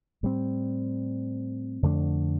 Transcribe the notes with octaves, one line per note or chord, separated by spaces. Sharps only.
A2 G3 C4
F2 D3 A3 D4